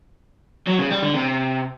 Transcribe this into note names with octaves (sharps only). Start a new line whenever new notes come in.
F#3
C#3
G3
D3
C3